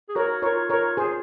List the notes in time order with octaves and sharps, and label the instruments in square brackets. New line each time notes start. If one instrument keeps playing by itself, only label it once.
[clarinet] G#4
[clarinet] F#4 [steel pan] A#4 C#5
[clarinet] F4 [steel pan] A#4 C#5
[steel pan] A#4 C#5
G#4 C5